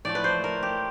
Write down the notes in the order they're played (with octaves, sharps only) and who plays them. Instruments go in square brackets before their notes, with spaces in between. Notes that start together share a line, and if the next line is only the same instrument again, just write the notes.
[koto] A2 F3 A3 D5
B4
C5
A#4
G4